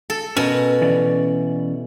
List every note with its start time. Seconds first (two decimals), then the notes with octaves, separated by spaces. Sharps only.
0.10 A4
0.37 B2 C#4 A#4
0.81 E3 C#4 D5